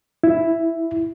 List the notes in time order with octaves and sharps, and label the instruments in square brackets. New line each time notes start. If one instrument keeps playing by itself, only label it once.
[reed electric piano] E4